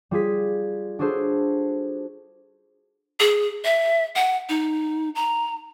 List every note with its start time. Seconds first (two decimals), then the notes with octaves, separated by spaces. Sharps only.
0.11 G3 F4 G#4 B6
0.99 D4 F#4 G#4 A4 C5
3.20 G#4
3.65 E5
4.16 F#5
4.49 D#4
5.15 A#5